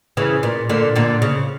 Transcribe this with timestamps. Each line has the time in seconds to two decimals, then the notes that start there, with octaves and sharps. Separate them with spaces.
0.17 C#3 E3
0.43 A#2
0.69 A#2 D3
0.96 A#2 D3
1.22 C#3